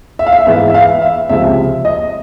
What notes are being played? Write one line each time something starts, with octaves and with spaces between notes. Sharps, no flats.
E5
F5
E5
G#2 E3 G#3 B3 E5
E5
F5
E5
C#2 C3 F3 G#3 E5
D#5